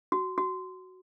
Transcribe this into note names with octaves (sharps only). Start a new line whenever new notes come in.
F#4
F#4